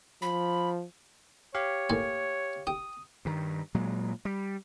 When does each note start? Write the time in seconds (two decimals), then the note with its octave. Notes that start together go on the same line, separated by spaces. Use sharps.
0.22 F3 B5
1.55 G4 C#5 F5
1.90 A2 A#3 G#5
2.67 G4 D#6
3.25 G2 D#3
3.75 A#2 F#3 G#3
4.25 G3